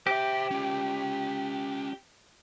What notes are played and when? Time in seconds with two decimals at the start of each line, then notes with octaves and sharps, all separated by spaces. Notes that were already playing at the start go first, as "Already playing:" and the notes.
0.07 G4 C5 E5
0.51 C#4 F4